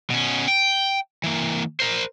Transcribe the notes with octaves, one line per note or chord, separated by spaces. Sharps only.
B2 C#4
G5
E3 A#3
A#4 C5